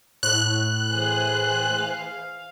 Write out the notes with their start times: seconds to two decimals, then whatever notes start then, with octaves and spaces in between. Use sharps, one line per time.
0.23 A2 F#6
0.90 E3 G#4 C5
1.78 F5